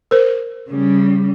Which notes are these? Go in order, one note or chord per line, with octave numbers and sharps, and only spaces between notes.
A#4 C5
C#3 G3